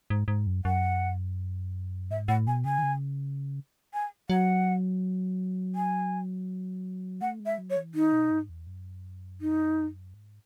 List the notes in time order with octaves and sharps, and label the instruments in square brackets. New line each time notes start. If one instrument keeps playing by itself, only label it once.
[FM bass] G#2
G#2
F#2
[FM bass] F#2 [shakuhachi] F#5
[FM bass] G#2 [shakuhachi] E5
[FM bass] A2 [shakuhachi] F#5
[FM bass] B2 [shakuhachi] G#5
[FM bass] C#3 [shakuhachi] G#5
[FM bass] D#3
C#3
[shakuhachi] G#5
[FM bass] F#3 [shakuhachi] F#5
[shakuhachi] G#5
[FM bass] A3 [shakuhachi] F#5
[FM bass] G#3
[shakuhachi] E5
[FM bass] F#3
[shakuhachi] C#5
[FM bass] E3
[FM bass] D#3 [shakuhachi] D#4
[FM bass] B2
G#2
E2
F#2
[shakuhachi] D#4
[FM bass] G#2